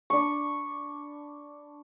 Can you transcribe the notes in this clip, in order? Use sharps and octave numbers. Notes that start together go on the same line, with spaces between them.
D4 B5 C#6